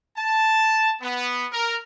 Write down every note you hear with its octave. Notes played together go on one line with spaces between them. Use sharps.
A5
B3
A#4